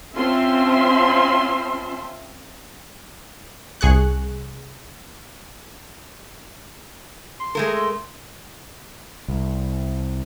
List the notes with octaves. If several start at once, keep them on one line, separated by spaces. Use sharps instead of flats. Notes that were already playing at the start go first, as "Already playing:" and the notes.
C4 C#4 F4 E5 A5 C6
C2 G#4 C#6 F#6
C6
G#3 A3 A#4
C2